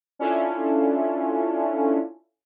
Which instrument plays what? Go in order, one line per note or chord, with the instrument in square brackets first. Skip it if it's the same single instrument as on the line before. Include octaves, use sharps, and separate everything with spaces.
[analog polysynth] C#4 D4 E4 F4 A4